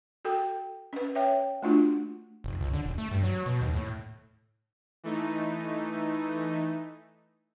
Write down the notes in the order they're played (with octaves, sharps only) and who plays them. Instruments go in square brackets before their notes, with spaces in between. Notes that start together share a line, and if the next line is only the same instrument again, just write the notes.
[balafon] F#4 A4 G5
C#4 B4
C#5 E5 G5
A3 D4 F4 F#4
[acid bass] F1
C#2
D3
D#1
A3
G2
F#3
B2
D#2
A2
[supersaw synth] E3 A3 D#4